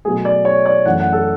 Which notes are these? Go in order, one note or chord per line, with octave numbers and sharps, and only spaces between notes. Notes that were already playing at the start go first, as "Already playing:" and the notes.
B2 F#3 A3 G#4
D5
C#5
D5
F#2 E3 A3 F#5
F#5
A4